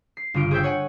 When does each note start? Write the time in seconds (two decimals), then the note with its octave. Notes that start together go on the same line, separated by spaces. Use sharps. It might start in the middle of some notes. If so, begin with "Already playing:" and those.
0.17 C7
0.34 G1 C#3 F4 D7
0.51 G#4 C5 E5 G5
0.63 C#5 F#5 G#5